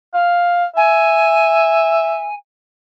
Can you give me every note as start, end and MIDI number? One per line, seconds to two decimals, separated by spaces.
0.14 0.65 77
0.76 2.27 76
0.76 2.34 80